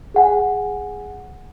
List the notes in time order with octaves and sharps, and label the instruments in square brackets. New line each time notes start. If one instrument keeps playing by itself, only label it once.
[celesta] G#4 F#5 G#5